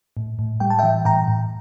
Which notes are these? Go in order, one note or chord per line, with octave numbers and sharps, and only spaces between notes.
A2
A2
G3 G5
A5
E5 G5
E3
A2 G5 A#5
A2